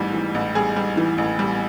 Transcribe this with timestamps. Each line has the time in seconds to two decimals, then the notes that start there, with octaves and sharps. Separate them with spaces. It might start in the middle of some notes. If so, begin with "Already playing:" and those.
Already playing: A1 G#2 E3 G3
0.13 E3
0.34 A1
0.55 G3 G#4
0.76 G3
0.97 E3
1.18 A1
1.39 G3